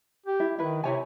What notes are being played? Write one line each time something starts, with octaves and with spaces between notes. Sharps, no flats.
G4
E4
D#3 E4 B4
C3 E4 C#5 G#5